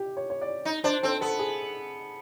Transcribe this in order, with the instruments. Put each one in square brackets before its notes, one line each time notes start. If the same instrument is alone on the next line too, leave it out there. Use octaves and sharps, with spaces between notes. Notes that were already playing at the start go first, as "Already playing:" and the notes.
Already playing: [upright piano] G4
C#5
C#5
D5
[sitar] D#4
[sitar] D4 [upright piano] C5
[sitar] C4 [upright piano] A4
[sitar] B3 [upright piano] A4
[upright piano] G#4